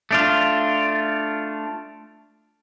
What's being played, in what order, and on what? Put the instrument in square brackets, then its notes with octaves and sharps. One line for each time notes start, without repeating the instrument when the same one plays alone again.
[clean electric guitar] A3 D4 F4